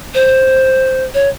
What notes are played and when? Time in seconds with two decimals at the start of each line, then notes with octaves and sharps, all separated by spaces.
0.14 C5
1.14 C#5